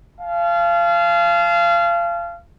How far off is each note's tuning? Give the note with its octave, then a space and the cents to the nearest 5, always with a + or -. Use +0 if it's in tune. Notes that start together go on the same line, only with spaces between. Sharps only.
F5 -25 A5 -40